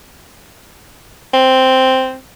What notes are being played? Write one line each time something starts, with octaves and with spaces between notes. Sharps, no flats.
C4